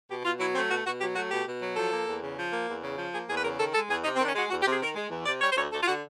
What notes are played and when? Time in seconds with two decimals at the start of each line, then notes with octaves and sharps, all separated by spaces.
0.10 B2 G4
0.24 B2 F4
0.40 F#3 E4
0.54 A3 C4
0.70 B2 F#4
0.85 B2 F#4
1.00 F#3 G4
1.15 A3 F#4
1.31 B2 G4
1.45 B2
1.61 F#3
1.76 F3 A4
1.92 A#3
2.07 E2
2.21 C#3
2.38 F3
2.52 A#3
2.67 E2
2.82 C#3
2.98 F3
3.13 A#3 G#4
3.28 E2 G#4
3.37 B4
3.44 C#3 A#4
3.58 D#3 A4
3.73 G#3 A4
3.88 E2 G#4
4.04 C3 D#4
4.16 C4
4.19 D#3 D4
4.27 C#4
4.34 G#3 F#4
4.50 E2 F#4
4.61 G4
4.65 C3
4.72 G#4
4.81 D#3 A#4
4.96 G#3
5.10 E2
5.26 C3 D5
5.42 G3 C#5
5.51 C5
5.56 D2 C#5
5.71 D2 A4
5.81 F4
5.87 D3 F#4